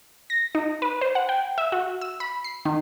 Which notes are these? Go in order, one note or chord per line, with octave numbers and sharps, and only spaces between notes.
A#6
D#4
B4
C5
F#5
G5
E5
F#4
E6
B5
C7
D#3